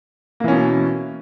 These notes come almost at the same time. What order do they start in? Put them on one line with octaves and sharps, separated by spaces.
A#3 E3 C#4 B2